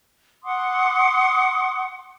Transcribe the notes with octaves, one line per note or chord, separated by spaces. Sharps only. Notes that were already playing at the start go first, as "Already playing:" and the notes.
F#5 C6 D6 D#6